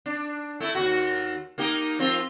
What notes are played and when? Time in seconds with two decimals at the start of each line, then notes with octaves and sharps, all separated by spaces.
0.06 D4
0.60 A3 E4
0.75 D#2 F#4
1.58 A#3 D#4 G4
1.99 F3 C4 F4